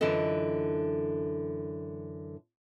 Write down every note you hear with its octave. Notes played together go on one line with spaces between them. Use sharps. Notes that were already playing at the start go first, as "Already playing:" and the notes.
F#2 D3 E3 F4 A4 D#5